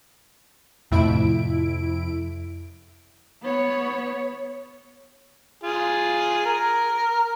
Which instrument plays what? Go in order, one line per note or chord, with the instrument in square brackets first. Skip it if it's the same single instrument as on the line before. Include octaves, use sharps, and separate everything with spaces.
[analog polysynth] F2 E4 D7 [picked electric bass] A2 C3
[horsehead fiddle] B3 C#5
[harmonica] F4 G#4
A#4